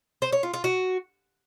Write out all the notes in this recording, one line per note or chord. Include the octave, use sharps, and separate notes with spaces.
C5
C#5
F4
F4
F#4